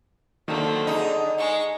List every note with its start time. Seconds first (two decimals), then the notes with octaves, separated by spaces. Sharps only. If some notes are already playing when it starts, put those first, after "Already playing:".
0.48 D3 D#3 F#3 A3 A#3 C4
0.87 D#4 G#4 D#6
1.38 G#3 C#6